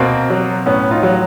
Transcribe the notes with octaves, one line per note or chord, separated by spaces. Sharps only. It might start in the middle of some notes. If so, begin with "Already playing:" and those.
Already playing: B2 A#3 C4
F#3
A2 B3 C#4
D#4 F4
F#3